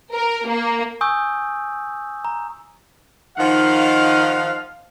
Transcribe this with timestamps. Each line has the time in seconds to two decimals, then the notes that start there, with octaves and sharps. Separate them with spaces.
0.13 A#4
0.48 A#3
1.01 G#5 C#6 D#6 E6 G6
2.25 A#5
3.37 D#3 F3 D#4 F5 F#5